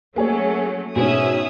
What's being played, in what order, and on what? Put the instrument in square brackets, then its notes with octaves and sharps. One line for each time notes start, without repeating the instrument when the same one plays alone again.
[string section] F#3 A3 C#4 [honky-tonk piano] A#3 G#4 C#5
[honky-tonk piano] G#2 B2 [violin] C#4 G#4 [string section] E5 D#6 E6